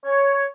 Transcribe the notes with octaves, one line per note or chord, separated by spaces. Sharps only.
C#5